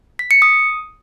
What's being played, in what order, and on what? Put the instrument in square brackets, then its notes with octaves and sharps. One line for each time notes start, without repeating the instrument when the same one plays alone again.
[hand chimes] B6
C#7
D#6